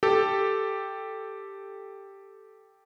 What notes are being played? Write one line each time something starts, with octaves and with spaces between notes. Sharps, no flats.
G4 A4